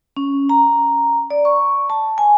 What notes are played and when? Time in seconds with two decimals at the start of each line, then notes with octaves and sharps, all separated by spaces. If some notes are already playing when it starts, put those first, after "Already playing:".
0.17 C#4
0.49 A#5
1.30 D5
1.45 C#6
1.90 A5
2.18 G#5